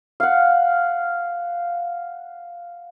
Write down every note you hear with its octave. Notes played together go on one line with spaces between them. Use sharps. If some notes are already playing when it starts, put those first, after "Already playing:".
F5 F#5